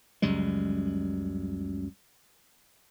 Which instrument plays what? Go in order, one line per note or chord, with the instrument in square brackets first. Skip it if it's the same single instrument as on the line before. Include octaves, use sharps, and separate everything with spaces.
[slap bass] C#2 F#2 G3 G#3